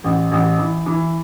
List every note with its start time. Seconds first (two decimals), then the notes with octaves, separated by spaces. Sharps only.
0.04 A1
0.31 A1
0.58 E3
0.86 E3